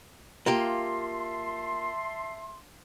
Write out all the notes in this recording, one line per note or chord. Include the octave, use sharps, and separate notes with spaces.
A#3 F4 G4 E5 A5 C6